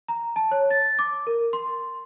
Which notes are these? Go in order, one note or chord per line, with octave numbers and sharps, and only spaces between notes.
A#5
A5
C#5
A6
D6
A#4
C6